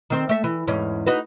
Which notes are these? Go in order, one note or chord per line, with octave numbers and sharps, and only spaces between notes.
D#3 C4 C5
A3 E5
E3
E2 G#2 C#4
D#4 F#4 B4